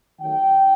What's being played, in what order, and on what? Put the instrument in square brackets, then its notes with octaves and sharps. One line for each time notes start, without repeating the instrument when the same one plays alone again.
[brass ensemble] D#3 F#3 A3 G5